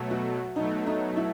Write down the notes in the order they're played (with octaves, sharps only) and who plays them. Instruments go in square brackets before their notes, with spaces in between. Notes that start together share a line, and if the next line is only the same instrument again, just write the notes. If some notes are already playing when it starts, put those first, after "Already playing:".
Already playing: [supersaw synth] B2 F#3 A3
[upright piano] F#4
[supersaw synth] B2 F#3 A3 [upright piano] D#4
[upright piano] D#4
E4